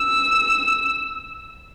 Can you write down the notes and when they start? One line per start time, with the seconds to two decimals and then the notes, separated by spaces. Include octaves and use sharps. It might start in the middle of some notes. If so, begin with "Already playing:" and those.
Already playing: E6